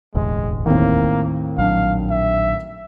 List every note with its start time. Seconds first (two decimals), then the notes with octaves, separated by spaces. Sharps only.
0.15 E1 A1 D2 G#3
0.66 D#2 A2 A#3 C4
1.58 A#1 F#3 D4 F5
2.10 E5